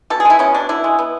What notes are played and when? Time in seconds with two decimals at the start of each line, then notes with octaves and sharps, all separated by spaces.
0.10 B2 A4
0.20 G#4
0.25 G#3 E4
0.39 B3 C#4
0.54 B2 D4
0.69 D3 E4
0.84 G#3
0.99 B3